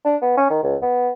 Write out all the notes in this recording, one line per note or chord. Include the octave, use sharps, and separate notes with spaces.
D4
B3
C#4
D#3
C#2
B3